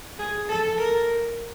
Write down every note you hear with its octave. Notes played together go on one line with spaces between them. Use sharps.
G#4
A4
A#4